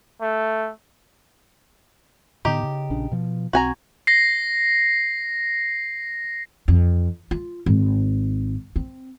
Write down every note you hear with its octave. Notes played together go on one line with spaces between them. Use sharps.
A3
A2 D3 B3 D#4 G4
C#3
A#1 C#3 D4
B2 F3
B1 C4 F#4 G#5 A#5
A#6 C7
F2
F4
G#1
C4